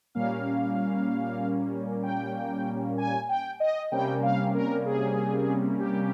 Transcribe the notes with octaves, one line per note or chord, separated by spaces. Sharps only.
A#2 G3 A#3 C#4 F5
G5
G#5
G5
D#5
C3 G3 A#3 C#4 G5
F5
A#4
G#4
G4